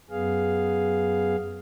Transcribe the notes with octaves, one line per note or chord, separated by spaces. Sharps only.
F#2 B3 G#4 F5